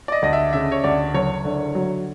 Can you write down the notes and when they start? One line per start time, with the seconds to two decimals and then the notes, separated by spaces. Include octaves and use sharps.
0.08 D5
0.12 D#5
0.22 D2 D#5
0.33 E5
0.53 C#3 E5
0.72 C#5
0.84 D2 D5
1.14 F#1 C#5
1.45 D3
1.75 F#3